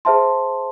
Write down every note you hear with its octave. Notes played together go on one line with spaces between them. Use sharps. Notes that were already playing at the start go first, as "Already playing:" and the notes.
G#4 C5 E5 A5 C6